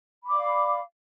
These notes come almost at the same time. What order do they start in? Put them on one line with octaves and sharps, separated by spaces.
B5 D6 D5 F5